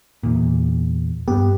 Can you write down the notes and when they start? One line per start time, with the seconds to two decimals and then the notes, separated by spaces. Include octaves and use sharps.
0.23 E2 A#2
1.28 G2 B3 G4